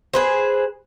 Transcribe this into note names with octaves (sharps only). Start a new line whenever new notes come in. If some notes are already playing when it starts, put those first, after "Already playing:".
G#4 B4 C5